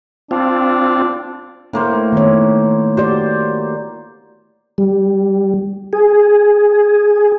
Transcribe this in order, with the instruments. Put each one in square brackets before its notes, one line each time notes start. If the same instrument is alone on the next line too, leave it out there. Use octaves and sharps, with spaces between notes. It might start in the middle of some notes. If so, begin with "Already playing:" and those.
[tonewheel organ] C4 F4 [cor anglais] D4
[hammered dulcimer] A2 A#3 C5 [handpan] D4
[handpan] D#3 B3 C#5
[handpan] F#4 G4 D5 [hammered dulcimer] C5
[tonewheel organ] G3
G#4